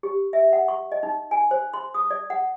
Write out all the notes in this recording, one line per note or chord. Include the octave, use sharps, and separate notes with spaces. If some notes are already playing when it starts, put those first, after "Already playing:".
G4
E5
F#5
C#6
D#5
D#4
G#5
C5
C6
D#6
D5
F#5